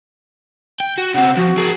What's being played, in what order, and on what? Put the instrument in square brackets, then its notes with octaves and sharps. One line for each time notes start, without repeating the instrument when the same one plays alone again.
[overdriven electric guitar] G5
F#4
[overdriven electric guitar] C#3 C4 [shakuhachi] F#5
[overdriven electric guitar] F3 [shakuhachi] F#4
[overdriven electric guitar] G#4 A#4